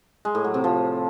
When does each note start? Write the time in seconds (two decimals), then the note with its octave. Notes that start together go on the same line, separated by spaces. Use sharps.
0.25 G#3
0.35 A2
0.44 F#3
0.54 C3
0.64 F3